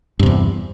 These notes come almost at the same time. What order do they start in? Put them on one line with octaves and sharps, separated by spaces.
G2 C3 E2